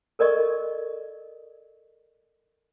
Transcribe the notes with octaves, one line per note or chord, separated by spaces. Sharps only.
A4 A#4 D5 D#5 C#6